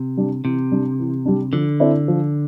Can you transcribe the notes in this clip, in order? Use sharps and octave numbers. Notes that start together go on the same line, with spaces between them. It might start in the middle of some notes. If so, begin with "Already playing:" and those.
Already playing: C3
G3 D4
C3 E3
G3 D4
E3
G3 D4
D3 F3
C4 E4 A4 D5
F3